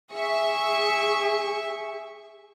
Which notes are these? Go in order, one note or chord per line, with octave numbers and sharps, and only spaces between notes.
G#4 E5 C#6